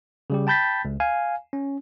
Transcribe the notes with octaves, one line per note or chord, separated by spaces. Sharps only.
C#3 G3 G4
G5 A5 B5 G6 A6 B6
C#2
F5 G#5
C#4